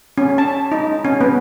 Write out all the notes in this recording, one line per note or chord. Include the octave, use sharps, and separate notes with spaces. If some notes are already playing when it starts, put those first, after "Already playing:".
C#4
A5
D#4
C#4
B3